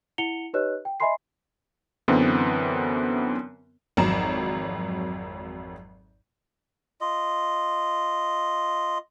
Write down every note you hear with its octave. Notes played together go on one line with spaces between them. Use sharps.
E4 F#5 C#7 F7 G7
D#4 G4 B4 C#5 D#5 F#6
G5
D#5 E5 G#5 B5 C6 C7
F#2 D3 E3 B3 C4
G#1 F2 F#3 A#5 E7
F4 D#5